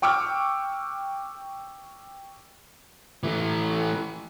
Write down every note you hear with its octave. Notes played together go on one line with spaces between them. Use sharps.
G5 C#6 D6 E6 F6
E3 A3